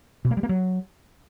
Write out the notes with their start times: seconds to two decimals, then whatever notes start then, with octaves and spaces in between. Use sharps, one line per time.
0.25 B2
0.31 A#3
0.37 G3
0.43 A#3
0.49 F#3